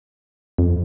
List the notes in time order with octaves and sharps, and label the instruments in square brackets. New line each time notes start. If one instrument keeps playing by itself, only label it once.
[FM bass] F2